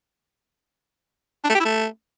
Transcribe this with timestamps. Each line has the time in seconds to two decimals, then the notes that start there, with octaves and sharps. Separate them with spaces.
1.44 D4
1.50 A3
1.55 G4
1.60 E4
1.65 A3